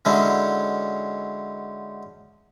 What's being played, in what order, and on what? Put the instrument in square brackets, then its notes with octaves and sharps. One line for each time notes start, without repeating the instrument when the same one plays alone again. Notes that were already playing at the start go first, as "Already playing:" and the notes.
[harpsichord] D3 F#3 G#3 C#4 D#4 E4